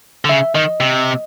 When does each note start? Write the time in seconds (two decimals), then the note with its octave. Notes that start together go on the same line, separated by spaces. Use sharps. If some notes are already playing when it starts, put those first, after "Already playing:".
0.25 D3
0.29 C#3 E5
0.55 D#3 D#5
0.80 C3